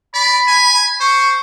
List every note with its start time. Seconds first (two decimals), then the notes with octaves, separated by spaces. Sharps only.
0.14 D5 B5
0.47 G#5
1.01 C5 C#6